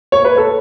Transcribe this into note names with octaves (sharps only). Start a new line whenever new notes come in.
C#5
B4
A4